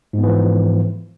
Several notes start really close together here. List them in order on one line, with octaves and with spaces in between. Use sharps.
G#2 B3 E3 F3